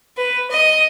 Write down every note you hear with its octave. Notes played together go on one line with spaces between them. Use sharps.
B4
D#5